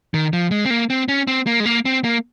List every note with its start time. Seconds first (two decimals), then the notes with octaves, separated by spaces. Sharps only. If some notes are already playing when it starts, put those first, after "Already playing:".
0.14 D#3
0.33 F3
0.51 G#3
0.65 C4
0.70 A#3
0.90 C4
1.08 C#4
1.27 C4
1.47 A#3
1.60 G#3
1.65 A#3
1.85 C4
2.04 A#3